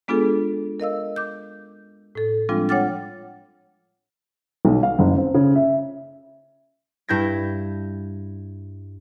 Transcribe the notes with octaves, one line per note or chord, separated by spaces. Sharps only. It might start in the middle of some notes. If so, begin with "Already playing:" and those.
G#3 B3 D4 F4 G#4 A4
A#4 D#5 F5 E6
D6 G6
A2 A4
F3 G3 G#3 C4 D4 F4
C#5 F#5 G5 D6 F6 A6
B1
F5
F#1
C4
C#3
E5
G2 E4 G6 G#6 A#6